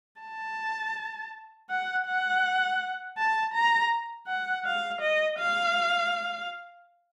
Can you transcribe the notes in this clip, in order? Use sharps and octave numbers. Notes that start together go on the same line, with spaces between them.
A5
F#5
F#5
A5
A#5
F#5
F5
D#5
F5